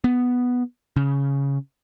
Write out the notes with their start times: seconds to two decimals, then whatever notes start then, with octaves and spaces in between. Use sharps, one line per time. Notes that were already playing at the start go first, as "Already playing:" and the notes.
0.04 B3
0.96 C#3